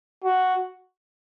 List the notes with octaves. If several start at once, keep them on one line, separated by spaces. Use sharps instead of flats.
F#4